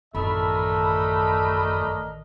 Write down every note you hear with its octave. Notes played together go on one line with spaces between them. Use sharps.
A1 F#2 D#3 A3 D4 A#4 D#5 B5